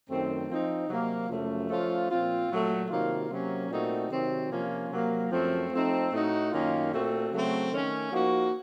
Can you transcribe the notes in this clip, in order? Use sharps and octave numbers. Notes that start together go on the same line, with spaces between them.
F#2 D#3 A3 C4
F3 C4 D#4
C3 F#3 A#3
F#2 C#3 F3 A3
F3 A3 C#4 F4
A#2 F3 C4 F4
A#2 F#3 A3
C3 D#3 F#3 A#3 F4
C3 F#3 A#3 C#4
A#2 A3 C4 D#4 F#4
C3 D#3 F#3 C4
C3 F3 A#3 C#4 F4
C3 F#3 A#3
F#2 F3 A3 C4
F3 A3 C4 D#4
A2 A3 D#4 F#4
F#2 D#3 A#3 C#4 F4
A#2 A3 C4 F#4
C#3 F#3 A3 C4
D#3 A3 C#4
F3 A#3 D#4 F#4